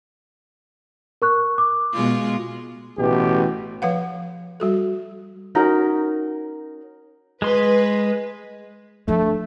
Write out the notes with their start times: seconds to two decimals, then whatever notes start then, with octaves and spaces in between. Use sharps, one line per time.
1.22 A#4 C#6 F#6
1.58 D6
1.93 B2 G#3 F4
2.98 A1 B2 E3 G4
3.82 F3 B4 F5 F#5
4.60 G3 F#4 A4
5.55 C#4 D#4 F#4 A#4
7.42 G#3 B4 C6
9.08 F3 A3 D4